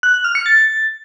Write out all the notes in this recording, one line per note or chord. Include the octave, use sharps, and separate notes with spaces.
F#6
F#6
F6
C#7
A6